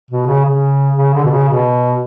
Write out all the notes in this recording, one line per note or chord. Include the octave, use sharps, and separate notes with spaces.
B2
C#3
C#3
C#3
D3
B2
C#3
B2